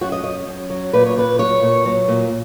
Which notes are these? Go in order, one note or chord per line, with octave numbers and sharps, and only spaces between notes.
F#2 F#4
D#5
F#2 D#5
F#2
F#3
A#2 B4
C#5
A#2 B4
F#3 C#5
A#2
F#3
A#2